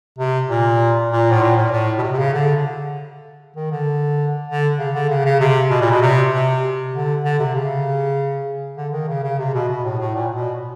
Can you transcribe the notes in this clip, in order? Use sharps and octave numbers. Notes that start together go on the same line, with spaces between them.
C3
A#2
A#2
A2
A#2
A2
A2
B2
C3
C3
C#3
D3
D#3
D3
D3
C#3
D3
C#3
C#3
C3
B2
A#2
B2
C3
C3
D3
D3
C3
C#3
D3
D#3
C#3
C#3
C3
B2
B2
A2
A2
A#2
B2